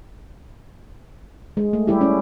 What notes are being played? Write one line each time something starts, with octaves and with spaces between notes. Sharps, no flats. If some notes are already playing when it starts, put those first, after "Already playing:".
G#3
A3
G3 E4 G4
C#4 E4